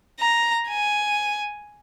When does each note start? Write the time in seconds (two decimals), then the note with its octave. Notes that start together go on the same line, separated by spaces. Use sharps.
0.20 A#5
0.68 G#5